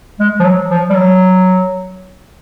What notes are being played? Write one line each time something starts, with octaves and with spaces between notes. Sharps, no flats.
G#3
F3
F#3
F3
G3
F#3